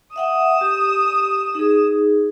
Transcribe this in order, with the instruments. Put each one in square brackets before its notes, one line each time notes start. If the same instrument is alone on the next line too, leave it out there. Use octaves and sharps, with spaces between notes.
[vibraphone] E5 F#5 G5 [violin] D#6 E7
[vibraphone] G4
D#4 G#4